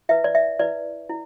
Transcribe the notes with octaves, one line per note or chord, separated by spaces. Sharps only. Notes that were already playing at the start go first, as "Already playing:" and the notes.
E4 B4 E5
D5
E5
E4 B4 D5
E4